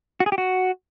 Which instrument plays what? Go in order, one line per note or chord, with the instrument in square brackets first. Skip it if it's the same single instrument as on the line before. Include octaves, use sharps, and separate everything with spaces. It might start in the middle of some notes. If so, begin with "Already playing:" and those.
[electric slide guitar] F#4
G#4
G4
F#4